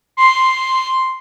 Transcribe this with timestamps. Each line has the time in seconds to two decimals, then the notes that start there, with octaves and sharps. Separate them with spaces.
0.17 C6